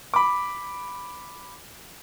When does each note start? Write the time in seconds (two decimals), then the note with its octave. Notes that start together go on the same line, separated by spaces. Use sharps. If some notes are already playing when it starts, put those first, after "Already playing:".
0.14 B5 D6